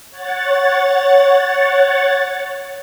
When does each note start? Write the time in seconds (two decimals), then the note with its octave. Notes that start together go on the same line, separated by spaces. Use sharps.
0.10 C#5 F#5 A6